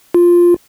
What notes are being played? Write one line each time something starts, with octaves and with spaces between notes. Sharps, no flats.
F4